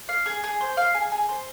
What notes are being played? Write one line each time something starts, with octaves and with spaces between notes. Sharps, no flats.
F5
G#4
G#4
C5
F5
G#4
G#4
C5